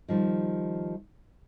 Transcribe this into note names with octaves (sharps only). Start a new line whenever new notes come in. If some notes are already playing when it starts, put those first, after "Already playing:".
D#3 F3 G3